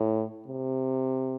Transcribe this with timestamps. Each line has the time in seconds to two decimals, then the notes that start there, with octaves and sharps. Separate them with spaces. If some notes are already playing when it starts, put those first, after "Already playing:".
Already playing: A2
0.47 C3